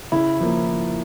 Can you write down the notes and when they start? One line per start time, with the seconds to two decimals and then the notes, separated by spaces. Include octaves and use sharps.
0.12 C#3 E4
0.41 F3 A#3